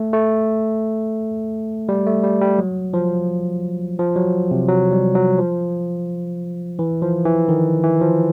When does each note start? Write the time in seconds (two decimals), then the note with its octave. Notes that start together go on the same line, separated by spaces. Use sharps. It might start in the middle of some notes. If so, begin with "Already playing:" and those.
Already playing: A3
0.13 A3
1.89 G3
2.06 A3
2.23 G3
2.41 G3
2.59 F#3
2.94 F3
3.99 F3
4.16 F#3
4.51 C3
4.68 F#3
4.92 G3
5.15 F#3
5.38 F3
6.79 E3
7.02 F3
7.25 E3
7.49 D#3
7.84 E3
8.01 F3